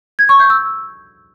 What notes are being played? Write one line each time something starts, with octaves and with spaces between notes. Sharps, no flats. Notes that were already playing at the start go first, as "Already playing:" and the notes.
G#6
C#6
G6
E6